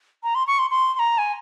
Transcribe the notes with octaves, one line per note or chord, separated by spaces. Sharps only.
A#5
C6
C#6
C6
C6
C6
A#5
G#5